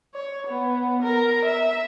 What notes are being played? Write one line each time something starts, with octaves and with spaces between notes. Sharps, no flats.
C#5
B3
A#4
E5